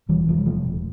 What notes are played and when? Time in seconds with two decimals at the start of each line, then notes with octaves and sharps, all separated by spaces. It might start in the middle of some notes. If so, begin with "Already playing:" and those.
0.09 E1 E3 G3
0.27 C3 F3
0.37 G3
0.45 E1 F3 A3
0.64 E1